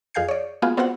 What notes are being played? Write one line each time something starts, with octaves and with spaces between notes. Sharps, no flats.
F2 G#4 F5 G#5 G6 C7
C#5 D5
G#3 A#3 B3 F4 F#4 G#4
B3 C4 F4 F#4 C5 F#5